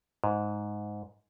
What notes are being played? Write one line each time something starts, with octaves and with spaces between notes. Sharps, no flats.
G#2